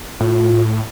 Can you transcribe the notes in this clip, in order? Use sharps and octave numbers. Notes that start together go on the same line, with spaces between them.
A2 F4